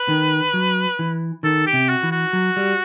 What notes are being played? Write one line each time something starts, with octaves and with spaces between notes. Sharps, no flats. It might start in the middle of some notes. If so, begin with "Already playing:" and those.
Already playing: B4
D#3
F#3
E3
D#3 A4
G4
C3
F#4
E3
F#4
F#3
G3